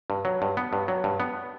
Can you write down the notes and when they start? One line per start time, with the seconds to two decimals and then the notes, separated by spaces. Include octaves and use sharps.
0.10 G2
0.25 F#3
0.42 G2
0.57 B3
0.73 G2
0.88 F#3
1.04 G2
1.20 B3